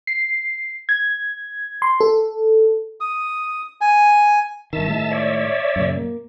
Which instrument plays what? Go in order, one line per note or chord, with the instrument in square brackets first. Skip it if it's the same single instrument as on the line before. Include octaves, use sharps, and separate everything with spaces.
[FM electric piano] C7
G#6
C6
A4
[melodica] D#6
G#5
[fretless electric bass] G1 D#3 [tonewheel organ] E5 A5
[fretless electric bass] A2 D#3 G#3
[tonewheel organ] C#5 D5 E5
[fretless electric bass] F#2 A#2 C#3
A#3